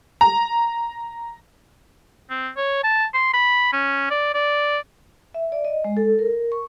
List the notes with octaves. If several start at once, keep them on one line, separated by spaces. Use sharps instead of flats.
A#5
C4
C#5
A5
C6
B5
C#4
D5
D5
E5
D5
D#5
G#3
A4
A#4
C#6